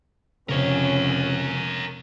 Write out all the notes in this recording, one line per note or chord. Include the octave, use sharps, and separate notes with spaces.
F1 C#3 C#4 A#4 C#5